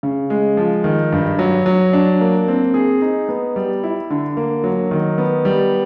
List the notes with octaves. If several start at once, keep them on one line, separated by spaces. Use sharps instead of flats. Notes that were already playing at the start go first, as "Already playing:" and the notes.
C#3
G#3
F3
D#3
G2
F#3
F#3
D4
A#3
C4
G#4
D#4
B3
G3
E4
D3
A#3
F#3
D#3
B3
G3